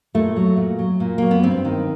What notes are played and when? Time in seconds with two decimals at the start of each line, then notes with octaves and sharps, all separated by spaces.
0.14 A#2 A3
0.36 F#3
0.57 A#2
0.79 F#3
1.00 A#2
1.18 F#3 A#3
1.31 B3
1.43 G2 C4
1.65 D#3